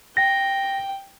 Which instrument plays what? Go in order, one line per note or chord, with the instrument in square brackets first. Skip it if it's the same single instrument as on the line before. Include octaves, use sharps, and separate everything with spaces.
[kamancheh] G5 [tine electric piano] A#6